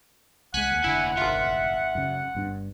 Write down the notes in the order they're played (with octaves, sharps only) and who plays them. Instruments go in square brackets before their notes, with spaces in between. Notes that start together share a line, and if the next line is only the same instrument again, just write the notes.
[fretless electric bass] C2 G#3 [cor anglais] F#5 [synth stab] G#5 F#6 B6
[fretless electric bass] D#2
[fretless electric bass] F1 D3 [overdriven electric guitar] D#2 G#5 [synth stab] E4
[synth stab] G#1 F4 [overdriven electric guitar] E5
[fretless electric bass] F#2 C#3
G1 G2 D4